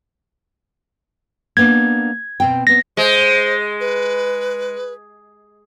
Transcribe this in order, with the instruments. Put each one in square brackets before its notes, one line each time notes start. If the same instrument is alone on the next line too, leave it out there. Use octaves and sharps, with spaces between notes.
[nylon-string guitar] A#3 B3 D4 [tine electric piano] G#6
[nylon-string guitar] B2 C4 G5
[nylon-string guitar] B3 C4 [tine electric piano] A#6
[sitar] G#3 [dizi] C5
[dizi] B4